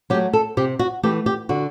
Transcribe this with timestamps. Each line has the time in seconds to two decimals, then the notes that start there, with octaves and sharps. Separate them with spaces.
0.10 F#3 G4
0.15 A3
0.33 A4
0.57 C3 G4
0.79 F#4
1.03 E3 A3 G4
1.26 G4
1.49 D3 F#4